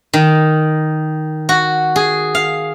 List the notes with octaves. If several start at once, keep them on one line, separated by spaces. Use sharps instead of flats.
D#3
F#4
G#4
F5